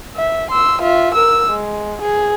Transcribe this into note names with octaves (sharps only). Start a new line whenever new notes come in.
E5
C6 E6
F4 E5
A#4 E6
G#3
G#4